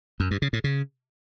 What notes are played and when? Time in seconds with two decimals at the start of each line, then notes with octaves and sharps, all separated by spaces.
0.20 F#2
0.31 G2
0.42 C#3
0.53 A2
0.64 C#3